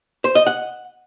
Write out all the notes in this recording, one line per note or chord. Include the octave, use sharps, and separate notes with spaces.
C5
D#5
F#5